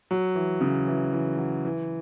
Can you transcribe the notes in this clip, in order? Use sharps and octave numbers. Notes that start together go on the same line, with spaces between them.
F#3
E3
C#3
E3
E3
F#3
E3